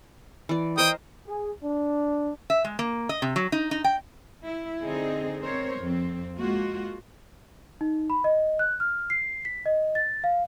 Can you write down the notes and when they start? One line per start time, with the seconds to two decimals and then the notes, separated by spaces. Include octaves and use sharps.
0.49 E3 D5
0.78 A#4 C5 D#5 G5 D#6
1.26 G#4
1.63 D4
2.50 E5
2.64 G#3
2.79 A#3
3.09 D#5
3.22 C3
3.36 F#3
3.52 D#4
3.71 D#4
3.84 G5
4.44 E4
4.82 D3 C4 D#4 G#4
5.42 C4 A#4 C5 C#5
5.82 F2 C4
6.38 G#3 A#3 F4 F#4
7.81 D#4
8.10 B5
8.24 D#5
8.59 F#6
8.80 F6
9.10 C7
9.45 B6
9.66 D#5
9.95 A6
10.24 F5